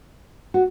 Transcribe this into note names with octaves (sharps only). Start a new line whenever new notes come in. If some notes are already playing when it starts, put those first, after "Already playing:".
F#4